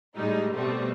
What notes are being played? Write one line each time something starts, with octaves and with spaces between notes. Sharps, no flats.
A2 G3 G#3 D#4
B2 G3 A3 B3 C4